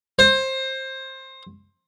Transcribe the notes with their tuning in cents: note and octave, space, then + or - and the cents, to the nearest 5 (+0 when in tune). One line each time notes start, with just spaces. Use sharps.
C5 +20